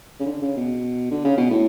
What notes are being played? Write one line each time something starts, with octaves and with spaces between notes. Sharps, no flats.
C#3
D3
C#3
B2
D3
C#3
B2
A2